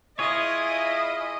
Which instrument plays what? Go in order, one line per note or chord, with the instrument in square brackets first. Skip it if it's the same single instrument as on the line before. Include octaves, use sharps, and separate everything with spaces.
[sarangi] E4 [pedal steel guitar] F4 G#4 C#5 [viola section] D#5